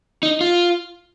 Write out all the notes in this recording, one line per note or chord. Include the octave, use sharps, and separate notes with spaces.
D#4
F4